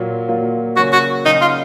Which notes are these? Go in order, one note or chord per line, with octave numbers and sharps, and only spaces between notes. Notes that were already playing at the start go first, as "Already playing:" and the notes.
Already playing: A#2 F#3 A#3 F4
A#2 F#3 A#3 F4
C#3 F#3 A#3 C#4 F#4
F#4
C#3 F#3 A#3 C#4 D#4
F4